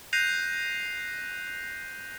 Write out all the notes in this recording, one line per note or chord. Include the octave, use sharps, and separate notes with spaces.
F#6 G6 A#6 C7 D#7 F7